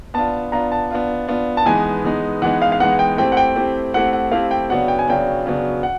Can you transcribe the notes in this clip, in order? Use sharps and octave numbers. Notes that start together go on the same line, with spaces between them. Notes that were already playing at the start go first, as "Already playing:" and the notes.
B3 D4 F4 A5
B3 D4 F4 A#5
A5
B3 D4 F4
B3 D4 F4
A5
E3 G#3 B3 D#4 G#5
E3 G#3 B3 D#4
E3 G#3 B3 D#4 F#5
F5
F5
E3 G#3 B3 D#4 F#5
G5
A3 C4 E4 G4 C5 G5
F#5
G5
A3 C4 E4 G4 C5
A3 C4 E4 G4 C5 F#5
F#5
A3 C4 E4 G4 C5 F5
G5
C#3 F#3 B3 D4 F#5
G5
G#5
C#3 F#3 B3 D4 G5
C#3 F#3 B3 D4
F#5